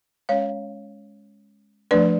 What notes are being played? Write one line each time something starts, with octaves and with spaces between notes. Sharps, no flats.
G#3 C#4 C#5 F5
F3 A3 D4 B4 D5